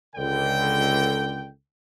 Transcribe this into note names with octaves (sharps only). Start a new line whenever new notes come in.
C#2 D3 A4 G5